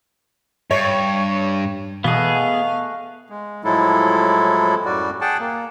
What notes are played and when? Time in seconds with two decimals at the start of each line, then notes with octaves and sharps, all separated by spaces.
0.71 G2 C#5
2.04 B2 E3 A3 B3 G#4 D#5 F5 F#5
3.30 G#3
3.64 A2 F3 F#3 G#3 E4 A4
4.85 F#2 A2 G3 F#4 D5
5.21 G#4 F#5 G5 A5
5.39 A#3